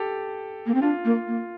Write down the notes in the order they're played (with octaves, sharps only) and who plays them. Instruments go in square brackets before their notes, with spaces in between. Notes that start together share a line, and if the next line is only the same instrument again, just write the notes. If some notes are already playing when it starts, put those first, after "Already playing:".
Already playing: [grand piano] G4 A4
[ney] A#3
C4
[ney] D4 [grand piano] F4
[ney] A#3
A#3